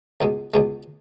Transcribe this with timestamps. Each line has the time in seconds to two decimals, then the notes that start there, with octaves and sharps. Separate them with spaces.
0.21 C#2 B2 G#3
0.54 C#2 B2 G#3